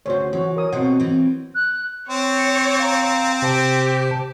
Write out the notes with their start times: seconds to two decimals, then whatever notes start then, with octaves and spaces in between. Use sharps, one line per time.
0.06 D2 C#3 F#4 C5 C#5
0.33 E3 F#4 C#5
0.56 A#4 C#5 D#6
0.72 B2 B3 C4 F#4 C5 F#5
1.00 E3 C4
1.55 F#6
2.09 C4 C#5
2.80 F5 A#5
3.42 C3 G4 C5 A5